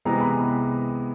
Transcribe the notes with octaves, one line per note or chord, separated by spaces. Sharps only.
C3 E3 G#3 B3 A#5
B5